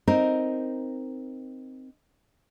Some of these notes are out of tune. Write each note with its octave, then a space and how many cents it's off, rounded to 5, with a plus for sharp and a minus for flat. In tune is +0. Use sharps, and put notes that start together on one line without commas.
C4 +0 D#4 +0 A#4 +0